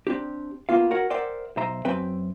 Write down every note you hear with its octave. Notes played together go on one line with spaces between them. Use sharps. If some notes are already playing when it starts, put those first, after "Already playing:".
C4 D4 G4
A#3 B3 F4 F5
F#4 A#4 C#5 F#5
A#4 C5 D5 E5 F#5 G5
B1 C5 E5 A#5
F#2 F#3 C4 B4 E5 G5